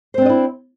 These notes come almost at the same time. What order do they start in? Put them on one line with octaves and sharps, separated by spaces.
C5 C4 D4 D#5 E4